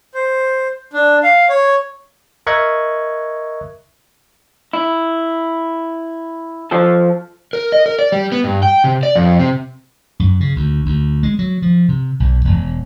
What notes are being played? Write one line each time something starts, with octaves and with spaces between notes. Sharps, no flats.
C5
D4
F5
C#5
A#4 D#5 E5 C#6 F#6 G#6
E4
F3 A4
A#4
D#5
A#4
D5
G3
B3
G2
G5
C3
D5
F2
C3
F#2
C#3
D2
D2
G#3
F#3
F3
C3
B1
E1